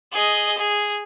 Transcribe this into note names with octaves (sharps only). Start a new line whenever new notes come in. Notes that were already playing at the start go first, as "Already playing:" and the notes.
G#4 D#5
G#4